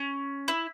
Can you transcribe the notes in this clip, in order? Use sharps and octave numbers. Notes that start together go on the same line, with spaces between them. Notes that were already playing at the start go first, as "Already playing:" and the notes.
Already playing: C#4
E4